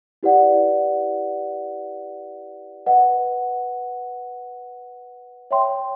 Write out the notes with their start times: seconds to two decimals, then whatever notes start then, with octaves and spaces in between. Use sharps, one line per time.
0.23 E4 G4 B4 D5 F#5
2.86 B4 D#5 F#5
5.51 C#5 E5 G5 C6